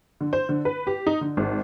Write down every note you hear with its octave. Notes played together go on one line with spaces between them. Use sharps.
D3
C5
D3
B4
G4
D#4
D3
G#1